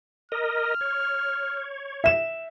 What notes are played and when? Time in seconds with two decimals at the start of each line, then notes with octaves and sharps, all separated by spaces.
0.32 A#4 D#5 F6
0.81 C#5
2.04 E5 E7